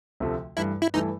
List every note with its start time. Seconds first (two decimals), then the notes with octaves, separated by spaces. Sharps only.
0.20 D2 C3 F3 A3
0.57 G2 E3 A3 E4
0.82 E4
0.94 G2 E3 A3 D#4